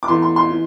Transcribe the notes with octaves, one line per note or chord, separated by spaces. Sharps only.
D6
E2 E3 A3 C6
C6
C6
E3